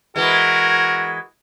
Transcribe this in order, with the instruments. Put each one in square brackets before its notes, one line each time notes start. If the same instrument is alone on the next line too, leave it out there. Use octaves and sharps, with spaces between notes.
[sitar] E3 G#3 [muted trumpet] F#4 [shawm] A#4